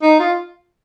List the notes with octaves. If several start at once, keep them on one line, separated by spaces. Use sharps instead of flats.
D#4
F4